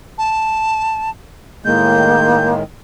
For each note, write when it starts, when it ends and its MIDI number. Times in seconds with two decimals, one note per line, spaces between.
0.18 1.10 81
1.65 2.63 45
1.65 2.63 51
1.65 2.63 56
1.65 2.55 58
1.65 2.48 91